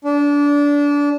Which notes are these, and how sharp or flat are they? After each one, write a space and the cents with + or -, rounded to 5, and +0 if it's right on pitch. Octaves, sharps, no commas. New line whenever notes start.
D4 -25